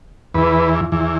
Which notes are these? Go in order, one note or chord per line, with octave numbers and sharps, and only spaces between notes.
E2 E3 B4
E2 E3